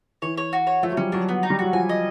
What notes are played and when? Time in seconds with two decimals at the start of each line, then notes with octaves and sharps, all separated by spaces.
0.22 E3 C#5
0.37 C#5
0.53 F#4
0.67 C#5
0.83 F3 A3
0.92 F#3
0.97 G3 C#4
1.12 F#3 D4
1.29 B3
1.43 D#4
1.50 G3
1.59 F#3 F#4
1.73 F3 G#5
1.89 D#5